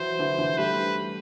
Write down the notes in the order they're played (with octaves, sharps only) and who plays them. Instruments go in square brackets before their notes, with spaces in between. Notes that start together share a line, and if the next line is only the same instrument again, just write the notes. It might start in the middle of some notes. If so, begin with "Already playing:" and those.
Already playing: [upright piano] E3 F#3 [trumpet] C5
[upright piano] D3 E3
D3 E3
[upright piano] G3 A3 [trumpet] B4